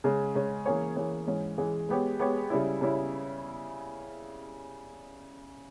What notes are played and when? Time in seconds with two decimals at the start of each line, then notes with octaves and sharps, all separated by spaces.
0.04 C#3 G#3 C#4
0.35 C#3 G#3 C#4
0.66 E3 A#3 C#4 G#4 C#5
0.96 E3 A#3 C#4 G#4 C#5
1.27 G#2 E3 G#3 C#4 G#4
1.58 G#2 E3 G#3 C#4 G#4
1.89 G#3 B3 G4 C#5
2.19 G#3 B3 G4 C#5
2.50 C#3 G3 C#4 E4
2.81 C#3 G3 C#4 E4